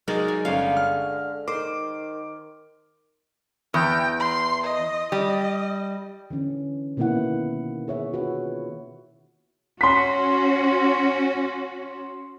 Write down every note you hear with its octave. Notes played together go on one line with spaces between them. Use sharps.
F#3 G#3 D#4 G#4 A#4 D5
G#5
G1 D3 C#4 G#4 C#5 F5
F6
D#3 C5 D6
E2 G5
C6
D#5
G3 D#5
D3 E3 C#4
B2 D#3 A#3 B3 E4 F#5
G#4 C#5 E5
F4 F#4 B4 C#5 F#5
C#4 F#4 C6 B6